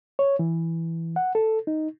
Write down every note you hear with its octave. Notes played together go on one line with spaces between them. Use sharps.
C#5
E3
F#5
A4
D#4